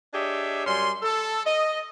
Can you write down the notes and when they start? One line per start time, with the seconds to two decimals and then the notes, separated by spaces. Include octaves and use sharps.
0.14 D4 G4 G#4 C#5 D#5 E5
0.66 F#2 G3 C#4 G#5 C6
1.03 A4
1.46 D#5